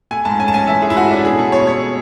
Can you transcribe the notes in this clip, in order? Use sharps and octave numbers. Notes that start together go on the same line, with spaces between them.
A3 G#5
G#2 A5
C#4 G#5
A5
C#4 G#5
E3 E5
A3 G#4
E4
G#2 F#4
C#4 D4
B2 G#4
A3 A4
B2 C#5
A3 C#5